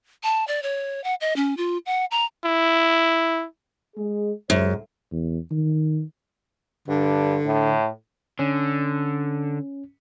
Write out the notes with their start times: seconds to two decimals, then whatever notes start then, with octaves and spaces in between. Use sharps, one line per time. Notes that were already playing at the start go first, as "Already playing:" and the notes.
0.23 A5
0.47 D5
0.62 C#5
1.04 F#5
1.21 D#5
1.36 C#4
1.57 F4
1.86 F#5
2.11 A#5
2.45 E4
3.96 G#3 G#4
4.50 C#2 F#2 G#3 C5
5.12 E2
5.51 D#3
6.88 G2 D3
7.45 A2
8.39 D3 C#4